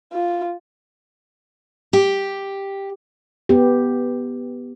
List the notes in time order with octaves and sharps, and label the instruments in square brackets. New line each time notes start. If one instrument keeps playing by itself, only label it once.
[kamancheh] F4
[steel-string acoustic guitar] G4
[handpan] B3 G4